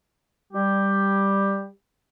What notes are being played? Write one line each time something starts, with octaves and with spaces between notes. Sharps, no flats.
G3 G4